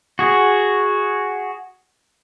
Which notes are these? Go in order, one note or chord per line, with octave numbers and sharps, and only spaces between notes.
F#4 G#4